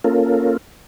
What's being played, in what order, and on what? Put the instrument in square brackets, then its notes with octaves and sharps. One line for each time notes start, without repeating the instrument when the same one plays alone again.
[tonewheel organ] A#3 C#4 F4 A4 A#4